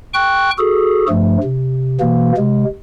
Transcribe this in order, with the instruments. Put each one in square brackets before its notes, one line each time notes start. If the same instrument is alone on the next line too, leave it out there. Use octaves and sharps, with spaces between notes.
[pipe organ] G5 C#6 F#6
F#4 G#4 A4
G2 F3 A3
C3
B2 E3 A#3
C3 G#3